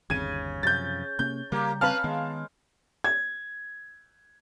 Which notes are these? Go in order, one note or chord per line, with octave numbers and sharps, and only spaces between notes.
G1 D#2 C#3 G#6 D#7
F#2 C3 F3 G6 A6
C3 A#3 C#4 G6
C#3 G3 A#3 G4
C#4 B4 F5 A5 F6
D#3 G#3 B3
G#6